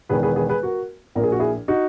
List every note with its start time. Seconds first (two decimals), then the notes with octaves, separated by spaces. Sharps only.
0.09 E1 E2 D#3 G#4 B4
0.23 G#4 B4
0.36 G#4 B4
0.50 G#4 B4
0.63 F#4 A#4
1.15 A#1 A#2 A#4
1.23 G#4
1.32 F#4
1.39 E4 G#4
1.68 D#4 F#4